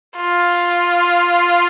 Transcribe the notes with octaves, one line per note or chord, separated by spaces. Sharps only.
F4